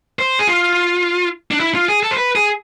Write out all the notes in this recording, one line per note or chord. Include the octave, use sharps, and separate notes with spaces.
C5
G#4
F4
D4
E4
F4
G#4
A4
C5
B4
G#4